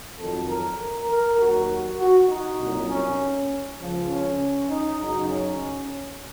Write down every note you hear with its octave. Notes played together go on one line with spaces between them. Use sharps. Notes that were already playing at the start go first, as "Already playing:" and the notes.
F2 D#3 F#3 A4
A#4
A#4
D#2 D#3 F#3 F#4
F#4
D#4
C2 A#2 F#3
C#4
C#2 C#3 F3
C#4
D#4
F#2 C#3 F#3 D#4
C#4